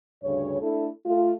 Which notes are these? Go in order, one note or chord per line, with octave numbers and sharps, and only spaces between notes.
D2 G2 C#3 C#5
A3 D4 E4 A4
A3 F4